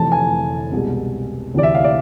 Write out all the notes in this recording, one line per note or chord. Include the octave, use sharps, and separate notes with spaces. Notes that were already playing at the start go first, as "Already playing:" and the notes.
Already playing: F1 F2 E3 A3 A5
G#5
C2 B2 G#3
D2 C3 E3 D5
E5
F5
D5